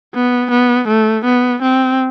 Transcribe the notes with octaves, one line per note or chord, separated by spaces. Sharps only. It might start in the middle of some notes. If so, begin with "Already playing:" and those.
B3
B3
A3
B3
C4